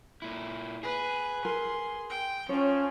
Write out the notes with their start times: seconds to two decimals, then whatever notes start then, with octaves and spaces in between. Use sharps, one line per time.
0.22 A#2 E4
0.83 G#4 B4
1.45 A#4 C6
2.10 G5
2.49 F3 C#4 C#5